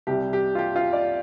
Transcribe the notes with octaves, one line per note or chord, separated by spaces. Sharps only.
C2 C3 G3 G4
G4
F4
G4
F4
D5